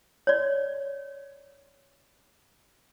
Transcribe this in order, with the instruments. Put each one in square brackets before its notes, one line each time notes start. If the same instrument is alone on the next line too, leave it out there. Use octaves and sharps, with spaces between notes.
[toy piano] C#5 D5